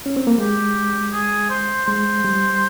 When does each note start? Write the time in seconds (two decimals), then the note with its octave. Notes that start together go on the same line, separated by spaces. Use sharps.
0.06 C#4
0.17 C4
0.27 A#3
0.38 G#3 G4
1.12 G#4
1.50 C5
1.87 G#3 C5
2.25 G3